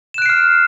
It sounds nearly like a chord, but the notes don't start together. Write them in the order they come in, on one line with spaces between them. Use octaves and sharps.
E7 F#6 D7 C7 F6